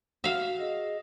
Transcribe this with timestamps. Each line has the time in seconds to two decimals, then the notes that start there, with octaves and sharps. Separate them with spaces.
0.24 F#4 E5 F5
0.59 G#4 D#5